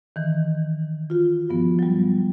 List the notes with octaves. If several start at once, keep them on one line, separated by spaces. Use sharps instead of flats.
D#3 E3
F4 F#4
G2 F3 B3
F#3 G3